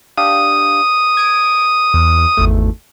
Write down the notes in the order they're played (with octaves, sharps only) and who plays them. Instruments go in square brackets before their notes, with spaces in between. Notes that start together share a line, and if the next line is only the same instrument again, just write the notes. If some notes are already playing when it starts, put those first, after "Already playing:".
[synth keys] D4 G4 F5 [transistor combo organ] D#6
[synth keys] G#6 D7
E2
G#1 E2 A3